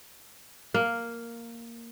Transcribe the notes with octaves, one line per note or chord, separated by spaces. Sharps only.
A#3